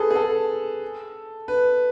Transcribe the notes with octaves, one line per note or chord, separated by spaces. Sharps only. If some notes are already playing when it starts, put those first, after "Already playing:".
Already playing: G#4 A4 B4
G#4
A4
B4